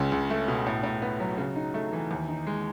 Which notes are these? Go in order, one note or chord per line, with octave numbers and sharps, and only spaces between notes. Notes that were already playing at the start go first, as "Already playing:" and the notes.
Already playing: C#2 C#3
C#2
A3
B2
A2
A2
B3
F#3
C#3
D#4
A3
E3
D#2
D#4
G#3